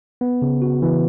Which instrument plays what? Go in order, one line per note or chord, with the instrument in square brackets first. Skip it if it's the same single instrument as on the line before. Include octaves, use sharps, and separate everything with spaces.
[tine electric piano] B3
C#3
F#4
E3